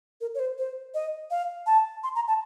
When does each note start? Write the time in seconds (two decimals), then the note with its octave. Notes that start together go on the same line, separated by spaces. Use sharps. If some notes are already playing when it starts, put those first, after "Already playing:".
0.21 A#4
0.35 C#5
0.39 C5
0.58 C5
0.94 D#5
1.30 F5
1.66 A5
2.03 C6
2.15 A#5
2.28 A5